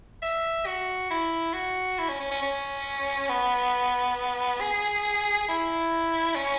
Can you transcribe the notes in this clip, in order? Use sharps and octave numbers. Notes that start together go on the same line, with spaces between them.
E5
F#4
E4
F#4
E4
C#4
C#4
C#4
C#4
B3
G#4
E4
C#4